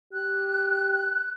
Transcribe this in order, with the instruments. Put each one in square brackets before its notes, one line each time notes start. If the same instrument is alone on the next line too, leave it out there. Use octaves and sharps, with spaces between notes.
[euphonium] G4 [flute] F#6